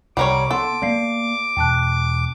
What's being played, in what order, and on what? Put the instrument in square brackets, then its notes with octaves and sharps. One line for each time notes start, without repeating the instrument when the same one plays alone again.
[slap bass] C2 [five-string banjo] G3 A#4 C#5 [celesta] F#5 [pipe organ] D6
[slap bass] B3 [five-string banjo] A4 [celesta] F#5 C6
[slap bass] A#3 B3 [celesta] D5 F5 C7
[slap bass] E2 B2 [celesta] G5 A5 F#6